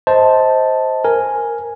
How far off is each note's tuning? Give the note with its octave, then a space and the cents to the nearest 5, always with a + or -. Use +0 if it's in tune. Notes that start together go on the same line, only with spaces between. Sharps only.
C5 +0 D#5 +25 A5 +0
A#4 +0 G#5 +0